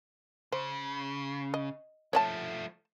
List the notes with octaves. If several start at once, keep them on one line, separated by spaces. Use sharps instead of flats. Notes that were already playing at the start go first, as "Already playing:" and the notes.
C#3 C5
D#5
F3 A3 C#5 D5 A5